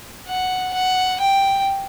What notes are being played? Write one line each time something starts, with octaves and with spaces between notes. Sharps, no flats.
F#5
F#5
G5